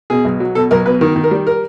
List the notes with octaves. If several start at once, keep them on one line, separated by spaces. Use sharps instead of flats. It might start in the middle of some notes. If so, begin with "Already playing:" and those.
B2 G#4
B1
F#3
B2 A4
B1 A#4
B2 B4
D#3 A#4
D#3
A#4
G3
A#4